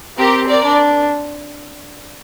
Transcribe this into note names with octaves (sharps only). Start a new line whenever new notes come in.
C4 G4 A#4
A#4 D5
D4